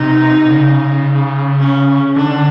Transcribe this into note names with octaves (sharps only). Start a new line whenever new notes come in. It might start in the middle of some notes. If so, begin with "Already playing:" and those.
Already playing: C3 D#4
C#3
C#4
D3 D4